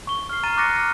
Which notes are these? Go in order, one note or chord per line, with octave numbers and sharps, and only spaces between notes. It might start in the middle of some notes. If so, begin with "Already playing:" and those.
C#6 G7
F6 C7
A#5 F6 A6 D#7
C#6 D6 F#6 A6 A#6 C#7
F6